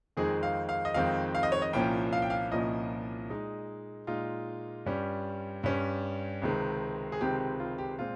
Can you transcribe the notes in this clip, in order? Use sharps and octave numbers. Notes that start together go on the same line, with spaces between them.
F2 D#3 G#3 C4 D#4 G#4
F5
F5
D#5
F2 D#3 G#3 C4 D#4 F5
F5
D#5
C#5
D#5
C2 A#2 F3 A#3 C#4 G5
F5
G5
F5
C2 A#2 F3 A#3 C#4 D#5
A#2 G#3 D#4
A#2 G#3 D#4 F4
G2 G3 C#4
G2 G3 C#4
C#2 C3 D#3 G#3 C4
G#4
C#2 C3 D#3 G#3 C4 G4
G4
F4
G4
A#2 G#3 C4 F4